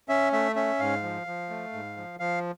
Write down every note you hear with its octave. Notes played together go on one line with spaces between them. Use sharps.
C#4 E5
A3 E5
C#4 E5
G#2 F5
F3
F3
A3
G#2
F3
F3 F5